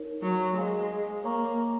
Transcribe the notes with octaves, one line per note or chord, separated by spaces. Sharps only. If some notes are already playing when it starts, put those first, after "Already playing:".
Already playing: D#4 A#4 C#5
F#3
G#3 C5 F5 G#5 C6
A#3 C#5 F5 A#5 C#6